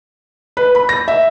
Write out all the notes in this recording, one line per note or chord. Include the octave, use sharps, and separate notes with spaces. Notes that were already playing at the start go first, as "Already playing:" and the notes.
B4
B5
A#6
E5